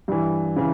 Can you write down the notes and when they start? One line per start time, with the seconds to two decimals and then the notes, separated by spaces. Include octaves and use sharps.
0.08 G2 E3
0.56 C#3 E3